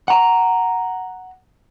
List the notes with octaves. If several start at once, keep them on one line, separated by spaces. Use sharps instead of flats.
F#5 A#5